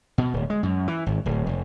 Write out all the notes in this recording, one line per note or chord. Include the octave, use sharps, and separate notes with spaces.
B2
D1
G#3
F#2
E3
G#1
D1
F1